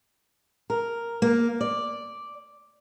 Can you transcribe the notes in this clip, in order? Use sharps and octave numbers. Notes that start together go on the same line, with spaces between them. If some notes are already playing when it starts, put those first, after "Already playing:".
A#4
A#3
D5